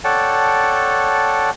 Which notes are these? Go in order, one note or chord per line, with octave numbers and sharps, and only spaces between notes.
A4 C#5 D5 F#5 G5 A5